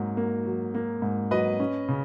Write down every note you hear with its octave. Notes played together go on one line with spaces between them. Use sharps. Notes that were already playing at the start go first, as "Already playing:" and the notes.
Already playing: G#2 F#3 A#3
A#3
F#3
A#3
G#2
F#3 B4 D#5
C#4
C#3